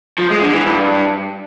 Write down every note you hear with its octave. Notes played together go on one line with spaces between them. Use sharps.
F3
G#3
D3
E3
G2